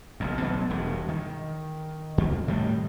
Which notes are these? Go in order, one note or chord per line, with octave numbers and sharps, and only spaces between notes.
F#1 B1 F#2
B2 F#3 B3
E1 G2
D#3
F2
A2 D#3 G3